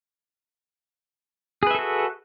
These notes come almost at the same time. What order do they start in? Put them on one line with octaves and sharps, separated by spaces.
G#4 B4 E5 A4 F#4